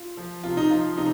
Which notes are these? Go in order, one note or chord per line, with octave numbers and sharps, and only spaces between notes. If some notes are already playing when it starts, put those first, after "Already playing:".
Already playing: F4
F3
C3 F4
D#4
F3 F4
C3 D#4